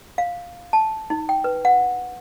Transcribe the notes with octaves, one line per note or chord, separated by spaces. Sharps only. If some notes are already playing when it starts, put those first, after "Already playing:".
F5
A5
D#4
G5
B4
F#5